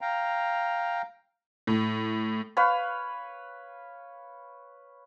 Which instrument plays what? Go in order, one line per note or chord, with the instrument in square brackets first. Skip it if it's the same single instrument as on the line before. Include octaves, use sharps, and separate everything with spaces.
[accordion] F5 G5 A#5
[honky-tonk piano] A2
[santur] B4 C#5 F5 B5